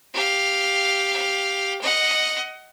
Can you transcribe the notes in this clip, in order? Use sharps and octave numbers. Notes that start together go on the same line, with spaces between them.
G4 F5
D#5 F#5